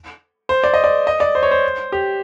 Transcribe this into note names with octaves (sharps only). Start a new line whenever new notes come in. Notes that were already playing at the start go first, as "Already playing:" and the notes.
C5
D5
D#5
D5
D#5
D5
C5
C#5
C5
G4